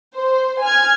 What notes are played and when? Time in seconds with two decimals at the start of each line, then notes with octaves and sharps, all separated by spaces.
0.17 C5
0.62 G#5 F6 G#6